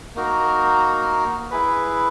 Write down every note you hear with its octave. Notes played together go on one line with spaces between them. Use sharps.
A#3 D#4 F#4 A#4
E4 G#4 B4